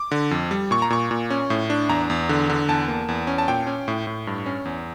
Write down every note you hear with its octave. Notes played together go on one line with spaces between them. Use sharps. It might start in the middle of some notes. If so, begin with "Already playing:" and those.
Already playing: D6
D3
F2
G3
A#2 C#6
A#5
A#2 C#6
A#2
C#4
A2
D4
E2 A#5
E2
D3
D3
E2 A5
A#3
E2
C#4
A5
A#2 G5
C#4
A2
A2
G2
C#4
E2